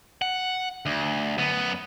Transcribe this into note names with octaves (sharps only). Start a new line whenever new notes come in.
F#5
D2
F#2 B3